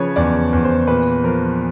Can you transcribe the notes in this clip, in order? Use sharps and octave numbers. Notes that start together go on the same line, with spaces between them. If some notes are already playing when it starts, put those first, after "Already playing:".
Already playing: C#3 F3 B4 C#5
E2 D5
E2
C5
A#2 B4
F3 A#4